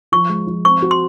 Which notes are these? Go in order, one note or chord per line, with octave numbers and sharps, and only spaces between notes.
F3 C#6
G#3
F3
C4 C#6
F#4
C6